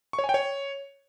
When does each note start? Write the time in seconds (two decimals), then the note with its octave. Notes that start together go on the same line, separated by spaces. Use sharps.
0.13 C#6
0.19 C#5
0.24 G#5
0.29 G5
0.34 C#5